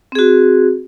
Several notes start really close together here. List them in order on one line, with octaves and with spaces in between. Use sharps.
C4 G#4 F#4